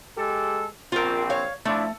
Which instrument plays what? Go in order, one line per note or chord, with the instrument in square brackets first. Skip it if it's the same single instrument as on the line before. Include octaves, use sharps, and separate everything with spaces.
[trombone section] G#3 G4 A4
[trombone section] A#1 C4 [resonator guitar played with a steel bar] F4 A#4
[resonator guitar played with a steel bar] C#5 F5
[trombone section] F3 D4 E4 [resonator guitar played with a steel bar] A3